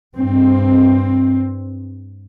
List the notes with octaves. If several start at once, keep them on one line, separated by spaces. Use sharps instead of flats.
G2 C4